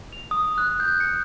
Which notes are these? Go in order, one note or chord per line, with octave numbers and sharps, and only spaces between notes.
F7
D#6
F#6
G6
C#7